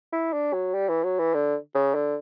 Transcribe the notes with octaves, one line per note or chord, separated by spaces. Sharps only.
E4
D4
F#3
G3
E3
F#3
E3
D3
C#3
D3